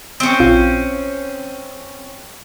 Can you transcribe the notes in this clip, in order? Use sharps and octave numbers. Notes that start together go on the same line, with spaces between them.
C4 C#4
A#1 F4